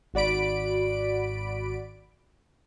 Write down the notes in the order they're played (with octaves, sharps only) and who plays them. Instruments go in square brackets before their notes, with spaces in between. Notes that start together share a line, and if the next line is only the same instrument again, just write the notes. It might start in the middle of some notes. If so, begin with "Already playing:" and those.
[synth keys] G#1 F#4 D5 B5 D7